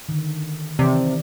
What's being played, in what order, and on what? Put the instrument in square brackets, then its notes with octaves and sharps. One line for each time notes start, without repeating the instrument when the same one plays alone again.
[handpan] D3 D#3
[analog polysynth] C3 [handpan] D#3 E3 D5